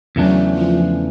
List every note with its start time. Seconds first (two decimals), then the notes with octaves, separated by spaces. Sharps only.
0.16 E2 C#3 E3 F#3 A3 D4
0.51 F3